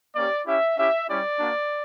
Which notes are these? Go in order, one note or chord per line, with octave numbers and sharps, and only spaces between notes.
A#3 C#4 G4 D5
C#4 E4 G4 E5
C#4 E4 G4 E5
G3 C#4 E4 G4 D5
A#3 D4 F#4